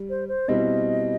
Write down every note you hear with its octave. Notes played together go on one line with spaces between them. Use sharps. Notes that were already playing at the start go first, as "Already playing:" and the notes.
Already playing: G3
C5
C5
B2 G3 C4 E4 D#5